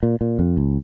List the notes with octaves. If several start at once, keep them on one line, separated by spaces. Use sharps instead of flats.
A#2
A#2
F2
C#2